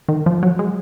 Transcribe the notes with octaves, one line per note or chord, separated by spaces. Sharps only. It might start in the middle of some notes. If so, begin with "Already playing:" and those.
D#3
F3
F#3
G#3